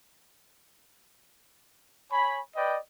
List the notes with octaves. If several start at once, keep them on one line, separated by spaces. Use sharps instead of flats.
C#5 G#5 B5
B4 D5 D#5 G5